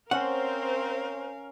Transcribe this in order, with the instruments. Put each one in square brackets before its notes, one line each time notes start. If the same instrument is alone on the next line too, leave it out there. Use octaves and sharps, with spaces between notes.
[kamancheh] C4 C5 [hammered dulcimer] C#4 [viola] A#4 F5 [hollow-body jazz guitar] F#5